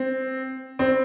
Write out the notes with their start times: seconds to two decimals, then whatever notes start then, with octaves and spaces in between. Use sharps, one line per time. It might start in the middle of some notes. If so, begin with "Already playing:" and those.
Already playing: C4
0.79 C4